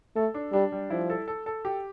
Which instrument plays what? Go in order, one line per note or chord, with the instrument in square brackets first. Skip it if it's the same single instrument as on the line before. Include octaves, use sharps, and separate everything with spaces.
[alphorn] A3 [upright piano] A4
[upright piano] D4
[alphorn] G3 [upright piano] D4
[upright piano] G3
[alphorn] F3 [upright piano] E4
[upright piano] A4
A4
A4
G4